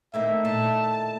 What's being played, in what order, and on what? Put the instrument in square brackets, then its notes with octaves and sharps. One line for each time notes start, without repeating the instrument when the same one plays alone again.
[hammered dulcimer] A2 D#3 [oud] A#3 C4 E4 [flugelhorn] E5
[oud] A#2 F4 [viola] A5